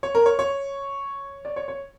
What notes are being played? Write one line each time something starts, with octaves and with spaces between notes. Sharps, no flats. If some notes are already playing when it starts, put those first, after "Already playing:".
C#5
A#4
C#5
C#5
D5
C#5
C#5